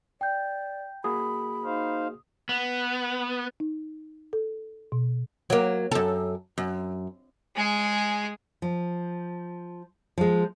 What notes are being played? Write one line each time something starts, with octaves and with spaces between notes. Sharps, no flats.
D5 G5 G6
A#3 F#4 G#4 B5 D#6
D#4 C5 F5
B3
D#4
A4
B2
F#3 A#3
F#2 A4
F#2
G#3 G#4
F3
F3 G#3